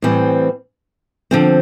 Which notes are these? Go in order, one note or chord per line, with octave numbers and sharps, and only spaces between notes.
A2 E3 G3 C4
D3 F3 C4